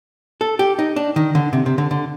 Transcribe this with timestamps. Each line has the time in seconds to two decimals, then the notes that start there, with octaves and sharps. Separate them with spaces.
0.41 A4
0.59 G4
0.79 D#4
0.96 D4
1.16 D#3
1.35 D3
1.53 C3
1.66 C3
1.78 D3
1.91 D3